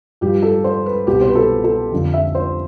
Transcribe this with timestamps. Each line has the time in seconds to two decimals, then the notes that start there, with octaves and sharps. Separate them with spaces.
0.21 G2 F3 G4
0.42 A4
0.64 C5
0.86 B4
1.07 C2 B2 G4
1.21 C5
1.29 B4
1.35 A4
1.64 A4
1.92 F2 D3 F3
2.14 E5
2.35 C5